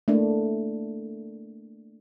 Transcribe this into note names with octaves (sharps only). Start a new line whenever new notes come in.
A3 A#3 D4